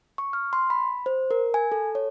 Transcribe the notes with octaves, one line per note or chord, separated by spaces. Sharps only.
C#6
F6
C6
B5
C5
A#4
G#5
A4
C#5